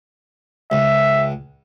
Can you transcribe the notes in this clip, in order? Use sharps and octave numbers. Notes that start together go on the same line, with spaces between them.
C#2 E5